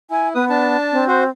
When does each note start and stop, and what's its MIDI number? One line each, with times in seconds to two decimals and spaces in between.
0.11 0.33 64
0.11 0.29 80
0.35 0.76 59
0.35 0.45 71
0.35 0.45 87
0.50 1.04 62
0.50 1.04 81
0.92 1.29 60
1.08 1.24 66
1.08 1.24 72